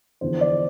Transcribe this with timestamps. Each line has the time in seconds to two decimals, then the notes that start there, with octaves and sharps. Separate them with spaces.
0.21 E2 D3 F3 C5
0.41 D5